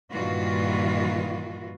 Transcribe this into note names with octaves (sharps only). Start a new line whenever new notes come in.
G2 A#2 D#3 E3 F4 F#4